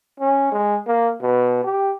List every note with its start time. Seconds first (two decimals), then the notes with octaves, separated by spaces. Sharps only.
0.20 C#4
0.52 G#3
0.87 A#3
1.22 B2
1.64 G4